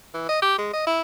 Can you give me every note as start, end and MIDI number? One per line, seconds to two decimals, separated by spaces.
0.14 0.26 52
0.29 0.40 75
0.42 0.58 67
0.58 0.72 56
0.73 0.84 75
0.87 1.02 64